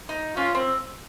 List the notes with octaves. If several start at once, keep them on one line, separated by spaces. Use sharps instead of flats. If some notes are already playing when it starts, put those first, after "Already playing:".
D#4
C#4 F4
C4